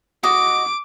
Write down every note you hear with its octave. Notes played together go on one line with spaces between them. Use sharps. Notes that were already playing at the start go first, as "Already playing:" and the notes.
F#4 D#5 D6 D7